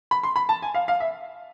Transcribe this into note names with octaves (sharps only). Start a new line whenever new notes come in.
B5
C6
B5
A5
G#5
F5
F5
E5